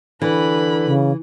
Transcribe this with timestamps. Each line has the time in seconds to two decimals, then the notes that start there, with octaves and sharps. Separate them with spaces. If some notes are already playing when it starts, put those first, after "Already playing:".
0.22 D3 E3 B4 B5
0.87 C#3